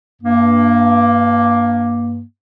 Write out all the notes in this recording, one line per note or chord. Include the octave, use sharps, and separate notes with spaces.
G2 A#3